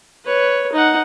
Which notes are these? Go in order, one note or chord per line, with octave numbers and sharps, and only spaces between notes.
B4 C#5
D#4 F#5